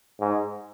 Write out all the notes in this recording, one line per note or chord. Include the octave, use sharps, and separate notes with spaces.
G#2